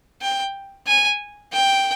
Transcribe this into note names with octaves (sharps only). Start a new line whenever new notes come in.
G5
G#5
G5